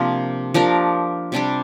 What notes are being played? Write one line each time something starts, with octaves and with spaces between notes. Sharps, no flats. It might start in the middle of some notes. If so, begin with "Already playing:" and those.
Already playing: C3 F3 A#3 D4
F3 D4 G4 A#4
C3 G3 D4 G4